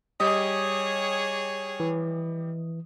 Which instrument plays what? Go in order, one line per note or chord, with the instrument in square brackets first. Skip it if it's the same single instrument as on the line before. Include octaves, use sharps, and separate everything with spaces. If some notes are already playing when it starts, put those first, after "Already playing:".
[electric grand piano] G3 G4 [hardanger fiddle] G#4 C#5 [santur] D#5
[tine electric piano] E3